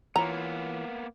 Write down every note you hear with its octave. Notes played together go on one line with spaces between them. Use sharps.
E3 A#3 B3 F4 C#5 A#5